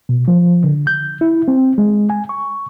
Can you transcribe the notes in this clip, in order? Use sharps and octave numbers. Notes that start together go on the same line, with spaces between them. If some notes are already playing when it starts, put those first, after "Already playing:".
B2
F3
D3
G6
E4
C4
G#3
G#5
C#6